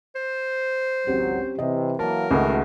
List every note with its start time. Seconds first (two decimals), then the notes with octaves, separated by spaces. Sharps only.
0.15 C5
1.07 G#1 C#2 F#3 C4 C#4 G4
1.59 C3 E3 D#5
1.99 E3 F#3 A#3 A#4 A5
2.31 C#2 D#3 A3 F#4 G#4